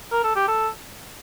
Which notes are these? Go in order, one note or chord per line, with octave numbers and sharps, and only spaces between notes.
A#4
A4
G4
A4